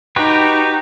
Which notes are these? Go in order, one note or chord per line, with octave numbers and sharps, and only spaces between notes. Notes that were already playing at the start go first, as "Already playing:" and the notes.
D#4 F#4 G4 B4